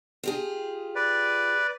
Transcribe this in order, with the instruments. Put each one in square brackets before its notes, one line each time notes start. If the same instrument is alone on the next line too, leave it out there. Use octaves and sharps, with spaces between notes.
[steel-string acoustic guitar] F4 G4 G#4
[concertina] B4 D5